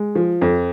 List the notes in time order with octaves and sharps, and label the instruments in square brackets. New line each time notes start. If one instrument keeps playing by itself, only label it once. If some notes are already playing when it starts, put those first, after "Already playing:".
Already playing: [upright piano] G#3
F3
F2